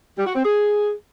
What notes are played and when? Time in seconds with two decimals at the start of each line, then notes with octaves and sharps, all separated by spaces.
0.17 G3
0.26 F#4
0.35 C4
0.44 G#4